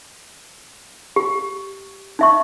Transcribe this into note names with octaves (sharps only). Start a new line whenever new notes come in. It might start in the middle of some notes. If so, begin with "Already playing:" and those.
G4
D#4 E5 C#6